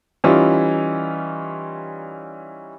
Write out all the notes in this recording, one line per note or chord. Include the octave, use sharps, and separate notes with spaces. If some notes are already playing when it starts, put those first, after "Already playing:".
E3 G3 C#4 D#4 F4